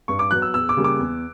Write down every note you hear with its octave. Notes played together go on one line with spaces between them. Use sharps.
G2 C#6
D6
F#3 B3 F#6
E6
E2 E6
D6
C#3 G3 A#3
D6
E2